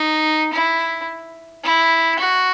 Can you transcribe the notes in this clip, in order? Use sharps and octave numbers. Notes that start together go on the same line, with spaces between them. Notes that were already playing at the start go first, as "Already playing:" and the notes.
Already playing: D#4
E4
E4
F#4